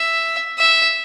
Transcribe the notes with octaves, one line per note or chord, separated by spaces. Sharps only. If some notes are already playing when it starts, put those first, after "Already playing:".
Already playing: E5
E5